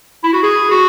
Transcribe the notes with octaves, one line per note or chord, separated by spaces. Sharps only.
E4
F#4
G#4
F#4